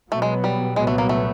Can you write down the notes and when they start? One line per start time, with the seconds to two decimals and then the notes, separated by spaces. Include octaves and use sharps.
0.11 B2 F#3 A3 B3
0.22 G#3
0.44 G3
0.76 C2 A#2 F#3 G#3 B3
0.87 A3
0.98 A#3
1.09 A3